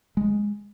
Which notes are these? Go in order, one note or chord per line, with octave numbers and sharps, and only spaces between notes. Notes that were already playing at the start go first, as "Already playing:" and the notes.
G#3